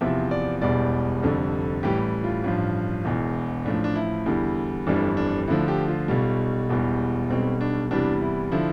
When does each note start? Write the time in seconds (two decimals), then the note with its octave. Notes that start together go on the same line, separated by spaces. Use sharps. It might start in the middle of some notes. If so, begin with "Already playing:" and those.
0.01 E2 C3 F3 E5
0.31 D5
0.61 E1 E2 B2 G3 D5
1.22 F1 F2 D3 G3
1.83 A1 A2 E3 G3 G4
2.24 F4
2.44 A1 G2 F3
3.05 E1 E2 B2
3.65 A1 A2 F3 D4
3.84 D4
3.96 E4
4.26 E2 D3 G3
4.87 G1 F2 E3 G3 D4
5.17 D4
5.48 D2 D3 F3 E4
5.68 G4
5.88 F4
6.08 B1 B2 G3
6.69 E1 E2 B2 G3
7.30 B1 B2 G3 C4
7.61 D4
7.91 E2 C3 E3 G3 D4
8.21 E4
8.52 D3 F3 E4